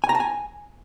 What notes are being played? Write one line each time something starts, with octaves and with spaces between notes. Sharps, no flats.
G#5
A#5
A5
G#5